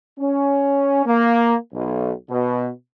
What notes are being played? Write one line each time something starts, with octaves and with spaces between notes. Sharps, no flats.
C#4
A#3
B1
B2